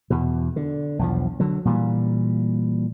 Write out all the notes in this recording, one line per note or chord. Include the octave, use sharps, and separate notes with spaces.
E2 B2
D3
B1 E2 F3
D3 F#3
A#2 E3 G3